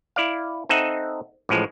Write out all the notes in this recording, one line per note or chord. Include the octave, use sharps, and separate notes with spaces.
E4 D5 F5
C4 D#4 A4 D#5 E5 F#5
A1 A2 F3 G#3